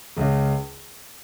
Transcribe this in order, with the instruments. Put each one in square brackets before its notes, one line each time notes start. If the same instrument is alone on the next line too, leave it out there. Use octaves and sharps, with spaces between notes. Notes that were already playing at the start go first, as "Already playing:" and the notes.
[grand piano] C#2 C#3